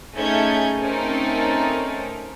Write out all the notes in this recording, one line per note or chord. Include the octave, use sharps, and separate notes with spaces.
A3 C#4 D#4 G#4 G6 G#6
A3 C4 C#4 D#4 A4 A#4